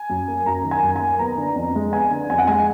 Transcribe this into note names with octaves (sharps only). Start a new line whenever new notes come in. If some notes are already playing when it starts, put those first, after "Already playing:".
Already playing: G#5
F#2
A#3
F#2 A#5
D#3
G#5
F#2
A#3 G#5
B3 A#5
D3
F2
G#3
B3 G#5
D3
F2 G#5
F#5
G#3 G#5